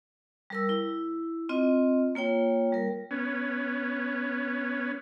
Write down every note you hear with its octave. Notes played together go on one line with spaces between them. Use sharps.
G3 A#4 E6
E4
C4 F4 D#5
A#3 F4 C#5 G5
G3 A#4
B3 C#4